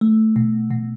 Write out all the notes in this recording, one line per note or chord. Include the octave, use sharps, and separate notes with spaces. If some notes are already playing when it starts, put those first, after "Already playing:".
A3
B2
B2